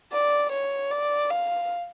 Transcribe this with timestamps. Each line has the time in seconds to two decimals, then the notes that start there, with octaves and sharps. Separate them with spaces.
0.12 D5
0.52 C#5
0.91 D5
1.30 F5